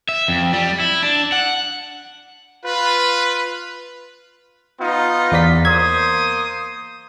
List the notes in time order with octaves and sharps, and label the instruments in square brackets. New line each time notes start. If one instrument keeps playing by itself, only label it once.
[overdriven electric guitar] E5
F2
G3
E4
D4
F#5
[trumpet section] F4 B4
B3 D#4 F4
[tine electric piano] E2 D5 B6
[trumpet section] A#3 C5 D#6 [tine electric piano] G#6